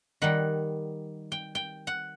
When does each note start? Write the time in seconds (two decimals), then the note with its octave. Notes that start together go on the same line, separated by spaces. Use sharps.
0.22 D#3 G3 F#5
1.32 G5
1.55 G5
1.87 F#5